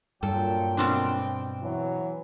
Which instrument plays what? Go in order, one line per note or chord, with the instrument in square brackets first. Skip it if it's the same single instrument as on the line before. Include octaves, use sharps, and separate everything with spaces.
[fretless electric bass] G2 [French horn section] A#2 F#3 [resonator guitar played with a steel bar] A4 [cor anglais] G5
[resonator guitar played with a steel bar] B2 C4 D4
[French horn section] E3 F#3